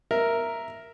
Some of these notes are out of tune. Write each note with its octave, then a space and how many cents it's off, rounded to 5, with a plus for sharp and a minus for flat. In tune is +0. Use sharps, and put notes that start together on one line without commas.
A#4 +0 E5 +5